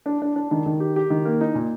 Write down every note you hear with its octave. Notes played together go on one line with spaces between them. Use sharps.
D4
D4
D4
D#3
D#3
G4
G4
D#3
A#3
D#4
A#2